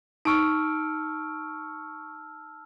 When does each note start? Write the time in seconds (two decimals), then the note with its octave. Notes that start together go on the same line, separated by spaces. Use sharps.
0.25 D#4 A5 C#6 E6 F6 D7